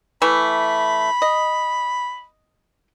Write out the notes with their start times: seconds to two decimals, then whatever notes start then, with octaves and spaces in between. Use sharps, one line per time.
0.22 E3 A3 B5
1.22 D#5